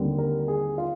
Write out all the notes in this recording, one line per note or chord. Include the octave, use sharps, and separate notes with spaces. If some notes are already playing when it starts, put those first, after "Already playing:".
Already playing: D#2 D3 G3 C4
A#4
G#4
F4